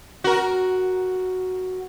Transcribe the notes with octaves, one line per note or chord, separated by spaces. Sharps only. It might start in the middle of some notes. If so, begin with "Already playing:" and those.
F#4 A#4